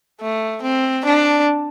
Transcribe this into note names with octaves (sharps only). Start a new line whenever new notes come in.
A3
C4
D4